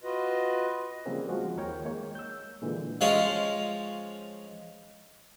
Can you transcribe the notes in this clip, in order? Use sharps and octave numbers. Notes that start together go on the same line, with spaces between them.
F4 F#4 B4 D#5
C#3 F3 G3 A#3 C4 G#4
F3 G#3 F#4
D#2 D#3 A#4 C#5 G5
G#3 A#3 C#5
E6 G6
A#2 D3 E3 G#3
F3 G#3 C#4 C#5 F5